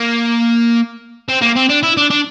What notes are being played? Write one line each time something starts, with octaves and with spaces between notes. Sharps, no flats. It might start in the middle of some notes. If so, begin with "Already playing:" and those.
Already playing: A#3
C4
A#3
C4
D4
E4
D4
D4